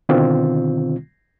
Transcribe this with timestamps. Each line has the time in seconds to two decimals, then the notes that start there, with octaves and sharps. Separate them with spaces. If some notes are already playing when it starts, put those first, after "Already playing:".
0.09 B2 D3 D#3 C4 F4